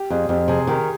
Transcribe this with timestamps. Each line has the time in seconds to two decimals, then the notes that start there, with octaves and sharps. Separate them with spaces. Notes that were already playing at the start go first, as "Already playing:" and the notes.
Already playing: G4
0.10 F2 G#4
0.29 F2 G4
0.48 C3 G#4
0.67 D#3 G4